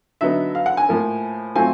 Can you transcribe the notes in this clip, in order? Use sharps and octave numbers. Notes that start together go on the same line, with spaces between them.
D3 F#3 B3 D#4 E5
F5
F#5
G#5
A2 F3 A#3
F#3 A3 C4 F4 G#5